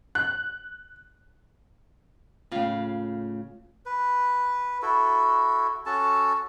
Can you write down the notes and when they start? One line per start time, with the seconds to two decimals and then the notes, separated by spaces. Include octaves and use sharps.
0.15 F#6
2.52 A2 C#3 F4 F5
3.86 B4
4.82 E4 F#4 A4
5.86 C#4 F#4 A4 A5